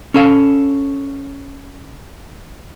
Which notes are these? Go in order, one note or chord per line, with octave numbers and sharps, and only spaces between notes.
C#4 A4 F5